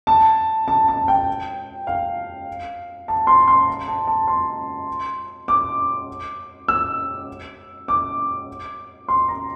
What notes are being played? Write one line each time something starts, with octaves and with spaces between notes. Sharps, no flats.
A5
A5
A5
G5
F5
A5
C6
C6
A#5
A5
A5
C6
D6
E6
D6
C6
A#5